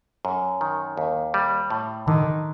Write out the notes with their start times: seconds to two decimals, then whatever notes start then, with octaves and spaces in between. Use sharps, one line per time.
0.25 F#2
0.61 D#3
0.97 D#2
1.34 G3
1.70 A2
2.08 D3 D#3